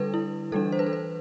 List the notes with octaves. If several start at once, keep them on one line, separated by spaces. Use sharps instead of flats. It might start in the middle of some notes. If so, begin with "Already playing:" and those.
Already playing: D3 G3 D4 A4 B4
E4
E3 G3 D4 A4
C5
B4
A4
B4